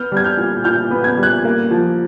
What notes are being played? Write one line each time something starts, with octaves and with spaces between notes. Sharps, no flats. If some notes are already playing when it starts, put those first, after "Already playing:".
Already playing: B3 F6 G6
G3 G#6
F6 G6
A#2
A#2 F6 G6
B3
G#6
G3
F#6 G#6
A#3
F3